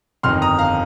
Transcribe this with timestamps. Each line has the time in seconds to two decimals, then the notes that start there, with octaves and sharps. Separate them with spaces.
0.23 G1 F2 D#3 C6 F6
0.42 A#5 D#6
0.59 F5 A#5